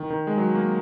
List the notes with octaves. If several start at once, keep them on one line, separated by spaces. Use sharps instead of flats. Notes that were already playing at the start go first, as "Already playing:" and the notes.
Already playing: D#3
D#3
G#3
F#3
A#3